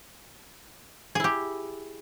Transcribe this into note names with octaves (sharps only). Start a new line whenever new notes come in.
E4 G4 G#4